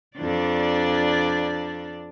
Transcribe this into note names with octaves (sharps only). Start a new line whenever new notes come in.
F2 D4 D5